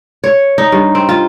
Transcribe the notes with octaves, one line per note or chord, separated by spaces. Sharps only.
C#5
D#4
G2
C4
F4